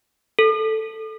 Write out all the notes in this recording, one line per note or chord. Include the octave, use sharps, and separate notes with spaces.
A4